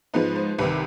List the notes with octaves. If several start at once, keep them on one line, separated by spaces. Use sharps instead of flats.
G#2 F3 G#3 B3 D#4 B4
C5
C2 C3 D#3 B4